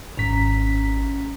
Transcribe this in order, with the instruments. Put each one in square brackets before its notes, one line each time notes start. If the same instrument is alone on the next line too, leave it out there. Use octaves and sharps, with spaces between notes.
[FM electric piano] G#1 B6 [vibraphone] C#4 A#5